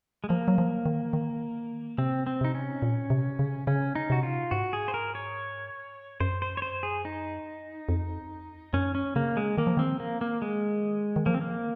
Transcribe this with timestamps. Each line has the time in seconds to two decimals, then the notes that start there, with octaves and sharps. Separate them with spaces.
0.24 G#3
0.29 F3 A#3
0.48 F#3
0.58 F3
0.86 D#3
1.13 D#3
1.98 C3 C4
2.27 C4
2.41 C3 D#4
2.55 C#4
2.82 A#2
3.10 C3
3.39 C#3
3.67 C#3 C#4
3.95 D#4
4.10 C3 F#4
4.23 F4
4.51 G#2 F#4
4.73 G#4
4.88 C5
4.94 A#4
5.15 C#5
6.20 F#2 C5
6.42 C5
6.57 C#5
6.62 C5
6.83 G#4
7.05 D#4
7.89 F2
8.73 F#2 C#4
8.95 C#4
9.16 C#3 A#3
9.37 G#3
9.57 D#3 A#3
9.67 F3
9.77 D#3 C4
10.00 A#3
10.21 A#3
10.42 G#3
11.16 D#3
11.26 F3 A#3
11.34 C4
11.41 A#3